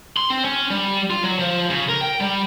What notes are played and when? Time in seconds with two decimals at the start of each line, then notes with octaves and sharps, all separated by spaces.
0.17 C6
0.30 C4
0.45 C#4
0.70 G3
1.10 F4
1.23 F#3
1.39 F3
1.70 C#3
1.89 A#4
2.01 G5
2.21 G3